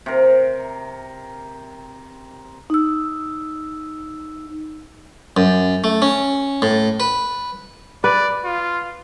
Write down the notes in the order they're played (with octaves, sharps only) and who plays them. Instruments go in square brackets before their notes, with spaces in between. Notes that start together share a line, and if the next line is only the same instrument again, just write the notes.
[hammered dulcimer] C3 A#4
[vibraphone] D#4 E6
[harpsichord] F#2
A3
C#4
A2
B4
[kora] B4 [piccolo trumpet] D5
[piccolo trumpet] F4